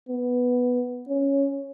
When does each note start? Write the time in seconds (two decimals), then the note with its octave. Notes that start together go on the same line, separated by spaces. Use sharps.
0.09 B3
1.09 C#4